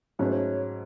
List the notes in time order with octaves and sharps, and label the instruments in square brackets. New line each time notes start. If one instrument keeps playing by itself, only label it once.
[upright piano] G#2 F#3 A3 C#4 [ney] C#5
[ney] B4
C#5